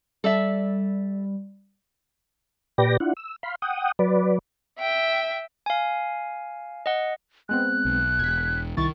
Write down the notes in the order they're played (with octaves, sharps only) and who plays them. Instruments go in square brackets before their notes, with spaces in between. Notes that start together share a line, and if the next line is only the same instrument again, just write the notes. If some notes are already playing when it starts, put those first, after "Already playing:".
[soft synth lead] G3 [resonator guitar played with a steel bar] A4 D5 E5
[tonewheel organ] A#2 G4 B4 D5 G5 A#6
D4 E4 F4 F#5
E6
F5 B5 C6
F#5 G5 D#6
F#3 B4 D5
[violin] E5 G5
[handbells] F5 G#5
D#5 F#5
[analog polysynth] G#3 B3 C4 [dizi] F#6
[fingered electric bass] B1
[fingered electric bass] E1 [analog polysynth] G#6 B6
[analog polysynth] C2 E4 A6 [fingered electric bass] D#3 [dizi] C#6